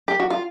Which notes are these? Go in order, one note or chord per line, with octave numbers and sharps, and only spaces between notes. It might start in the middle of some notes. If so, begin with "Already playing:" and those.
G4
F#4
F4